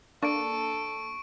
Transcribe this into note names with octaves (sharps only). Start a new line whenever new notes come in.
A#3 D4 A4 C#6 D7